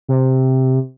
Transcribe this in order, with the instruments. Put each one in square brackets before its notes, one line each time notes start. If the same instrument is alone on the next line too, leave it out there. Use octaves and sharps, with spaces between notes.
[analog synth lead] C3